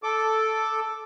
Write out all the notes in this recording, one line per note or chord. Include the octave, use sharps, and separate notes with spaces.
A4 D6